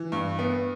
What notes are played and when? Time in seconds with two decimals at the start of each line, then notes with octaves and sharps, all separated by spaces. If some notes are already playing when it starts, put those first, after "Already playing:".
Already playing: E3
0.12 G2
0.39 B3